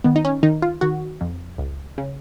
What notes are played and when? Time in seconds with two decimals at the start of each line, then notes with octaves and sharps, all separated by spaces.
0.04 D#3 B3
0.16 D#4
0.25 C#4
0.43 D#3 D#4
0.62 F4
0.81 D#3 F#4
1.21 F2
1.58 C#2
1.98 C#3